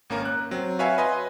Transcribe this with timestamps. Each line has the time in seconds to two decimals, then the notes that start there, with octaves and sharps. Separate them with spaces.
0.10 G#1 A#3 C#4 A#4
0.25 F#6
0.51 F#3 C4
0.79 F#4 B4 C#5 E5 F5 G#5
0.98 B4 D#5 G#5 C6